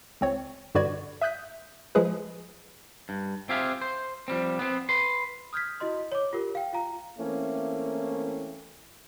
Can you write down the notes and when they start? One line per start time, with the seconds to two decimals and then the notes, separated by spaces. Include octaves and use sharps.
0.21 C#2 C4 C#5
0.75 G2 D3 F#4 B4 D5 G#6
1.21 E5 D#6 F#6 G6 B6
1.95 F3 G#3 G#4 B4
3.09 G2
3.49 C4 F4 G4 G#4 E5 F5
3.82 C5
4.28 F3 G3 C4
4.59 B3 C4
4.89 B4 C6
5.53 D#6 F6 G6 G#6 B6
5.80 E4 F#4 D#5 C6
6.12 C#5 D6
6.33 F4 G4 A#4
6.55 F5 G5
6.73 F4 F5 A#5
7.17 E3 A3 A#3 C4 C#4 E4